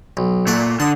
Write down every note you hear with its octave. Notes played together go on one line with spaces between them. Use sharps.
B1
A#2 A3 D5 F#5
D3 A5 D#6